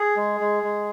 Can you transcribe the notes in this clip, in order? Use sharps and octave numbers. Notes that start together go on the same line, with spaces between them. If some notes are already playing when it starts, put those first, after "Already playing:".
Already playing: G#4
G#3
G#3
G#3